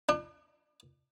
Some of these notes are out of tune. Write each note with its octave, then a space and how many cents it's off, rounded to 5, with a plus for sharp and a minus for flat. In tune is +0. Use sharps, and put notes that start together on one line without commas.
D4 +40